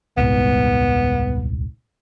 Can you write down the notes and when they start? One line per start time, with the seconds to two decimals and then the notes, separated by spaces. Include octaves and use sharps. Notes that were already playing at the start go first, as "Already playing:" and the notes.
0.17 D#1 C2 G#2 B3